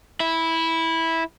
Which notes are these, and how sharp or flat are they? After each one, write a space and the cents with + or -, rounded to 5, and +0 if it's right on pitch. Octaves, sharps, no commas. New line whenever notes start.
E4 -10